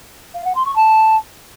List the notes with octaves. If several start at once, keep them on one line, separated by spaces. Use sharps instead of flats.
F5
F#5
C6
C#6
A5